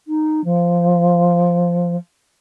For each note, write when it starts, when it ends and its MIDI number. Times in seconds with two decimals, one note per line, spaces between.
0.07 0.44 63
0.44 1.96 53